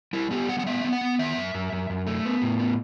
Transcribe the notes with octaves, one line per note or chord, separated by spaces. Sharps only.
G3 E4
B3 G4
G3 F#5
F#5
B3 E5
B3
F#5
B3
D#3 E5
F#2
F#2
F#2
F#2
A3
B3
A2
B3